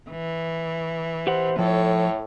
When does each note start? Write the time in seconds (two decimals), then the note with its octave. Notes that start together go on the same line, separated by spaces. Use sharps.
0.10 E3
1.27 G4 C5 F#5
1.59 A2 F3 A4 C#5